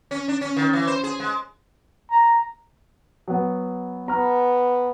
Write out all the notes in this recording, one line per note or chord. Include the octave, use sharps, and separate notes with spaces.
C#4
D4
C#4
D#3
E3
C5
G#4
G#3
A#5
F#3 B3
B3 A#5 F6